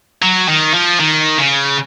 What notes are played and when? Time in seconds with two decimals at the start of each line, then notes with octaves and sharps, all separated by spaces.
0.22 F#3
0.49 D#3
0.74 F3
1.00 D#3
1.38 C#3